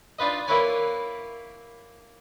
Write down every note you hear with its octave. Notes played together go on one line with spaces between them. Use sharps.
D4 D#4 F4 B4 D#5
A#3 E4 A#4 B4 C#5 G#5